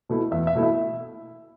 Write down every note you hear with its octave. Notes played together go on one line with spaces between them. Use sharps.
B2 A3 E4
E2 E5
E5
B2 A3 E4
E5